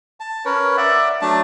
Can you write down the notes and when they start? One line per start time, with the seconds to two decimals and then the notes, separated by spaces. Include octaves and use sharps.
0.20 A5
0.45 C#4 A#4 B4 C#5
0.77 D5 E5 F#5
1.22 F#3 A3 D4 A5